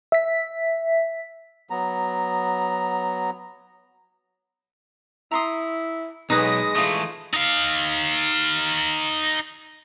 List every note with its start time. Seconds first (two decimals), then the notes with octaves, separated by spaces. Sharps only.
0.12 E5 B6
1.70 F#3 B3 A#5
5.31 E4 A#5 C6 D#6
6.30 B1 G#3 D#4 B4 G#5 D#6 A#6
6.76 E3 A3 F4 D#5
7.34 D#4 F5